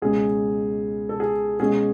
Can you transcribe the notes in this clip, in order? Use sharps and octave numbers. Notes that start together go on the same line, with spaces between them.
C#2 B2 G#3 C#4 G#4
A4
G#4
B2 G#3 C#4 G#4